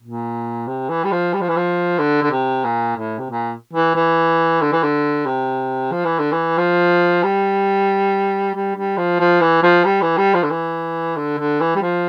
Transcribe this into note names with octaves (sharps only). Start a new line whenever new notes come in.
A#2
C3
E3
G3
F3
G3
F3
E3
F3
D3
D3
C3
A#2
A2
C3
A#2
E3
E3
D3
E3
D3
C3
F3
E3
D3
E3
F3
G3
G3
G3
F3
F3
E3
F3
G3
E3
G3
F3
D3
E3
D3
D3
E3
G3
F3